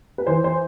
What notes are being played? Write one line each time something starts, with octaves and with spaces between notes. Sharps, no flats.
B4
E3 C5
C5